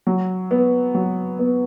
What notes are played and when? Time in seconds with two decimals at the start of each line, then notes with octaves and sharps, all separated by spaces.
0.07 F#3
0.51 B3
0.95 F#3
1.39 B3